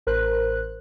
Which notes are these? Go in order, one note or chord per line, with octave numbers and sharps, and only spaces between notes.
A1 A#4 C5 F#6